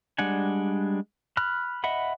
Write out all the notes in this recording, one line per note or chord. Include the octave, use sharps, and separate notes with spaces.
G3 G#3 D4 F#5 G#5
B5 F6 F#6
D#5 E5 F#5 B5